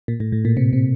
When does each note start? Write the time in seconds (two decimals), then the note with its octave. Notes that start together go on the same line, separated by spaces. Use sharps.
0.08 A#2
0.20 A2
0.32 A2
0.45 A#2
0.57 C3
0.73 C3